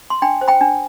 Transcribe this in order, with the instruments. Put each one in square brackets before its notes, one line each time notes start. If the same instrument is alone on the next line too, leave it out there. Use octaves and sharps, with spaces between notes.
[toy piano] C6
D4 G5 B5
C5
G5 B5
D4